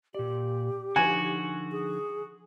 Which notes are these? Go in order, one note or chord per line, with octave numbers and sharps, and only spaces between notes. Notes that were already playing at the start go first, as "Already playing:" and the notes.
A#2 G4 D5
D3 F3 D#4 F#4 G#5
G#4